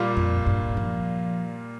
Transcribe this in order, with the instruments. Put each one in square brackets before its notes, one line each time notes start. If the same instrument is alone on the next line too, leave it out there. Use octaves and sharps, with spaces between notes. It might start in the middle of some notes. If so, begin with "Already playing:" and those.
Already playing: [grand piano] A#2 G3 A#3 F4
[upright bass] F2
G2
F3